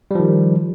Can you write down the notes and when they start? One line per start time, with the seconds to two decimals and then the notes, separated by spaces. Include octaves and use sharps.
0.11 G3
0.15 F3
0.20 D#3